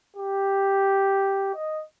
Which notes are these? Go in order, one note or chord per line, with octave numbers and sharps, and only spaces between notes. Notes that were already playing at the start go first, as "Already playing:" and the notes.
G4
D#5